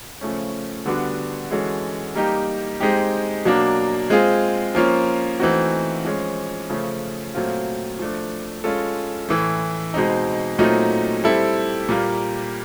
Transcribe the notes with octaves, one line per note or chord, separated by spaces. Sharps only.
C#3 F3 A3 C#4
D3 G3 B3 D4 F#4
E3 G#3 C#4 F#4 A4
G3 A#3 D#4 G4
G#3 C4 D#4 G4
B2 F#3 A#3 D4
G#3 C4 F4 G#4
F3 A#3 C#4 F4
E3 A3 C4 D#4 F#4
F3 G#3 C#4
C#3 F3 A3 C#4
A#2 F#3 A3 C4 F4
F3 A3 D4
G#3 C#4 F4 A4
A2 E3 A3
B2 G#3 C4 D#4
A#2 F#3 A3 C4 D#4
G3 C4 E4 A4
A#2 G3 A#3